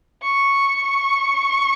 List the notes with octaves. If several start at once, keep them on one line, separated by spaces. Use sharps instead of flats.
C#6